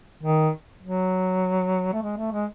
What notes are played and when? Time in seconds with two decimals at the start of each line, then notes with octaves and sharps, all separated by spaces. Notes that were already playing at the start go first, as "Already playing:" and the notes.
0.23 D#3
0.83 F#3
1.93 A3
2.03 G#3
2.17 A3
2.32 G#3